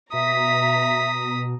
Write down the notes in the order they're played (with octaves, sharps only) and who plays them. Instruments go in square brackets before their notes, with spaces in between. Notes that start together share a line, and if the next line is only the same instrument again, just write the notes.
[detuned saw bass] B2 [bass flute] E5 [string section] A#5 B6 [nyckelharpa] D#6